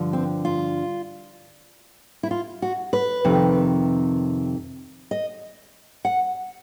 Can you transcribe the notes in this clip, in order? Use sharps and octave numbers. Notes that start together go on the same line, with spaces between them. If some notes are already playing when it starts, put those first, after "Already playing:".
Already playing: G2 D3 F3
C4
F4
E4
F4
F#4
B4
F2 C3 D#3
D#5
F#5